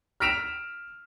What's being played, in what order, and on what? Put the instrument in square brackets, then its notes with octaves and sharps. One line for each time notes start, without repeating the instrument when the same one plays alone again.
[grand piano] F6 A#6 B6 D7 E7 F7